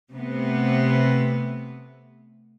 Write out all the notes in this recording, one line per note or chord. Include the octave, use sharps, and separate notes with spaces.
C3 A3 B3